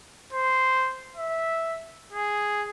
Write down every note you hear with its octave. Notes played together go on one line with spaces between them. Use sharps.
C5
E5
G#4